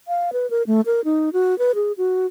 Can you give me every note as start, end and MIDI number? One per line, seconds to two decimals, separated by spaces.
0.08 0.30 77
0.33 0.49 71
0.50 0.63 70
0.67 0.81 57
0.86 1.01 70
1.05 1.30 63
1.33 1.57 66
1.59 1.72 71
1.75 1.92 68
1.98 2.26 66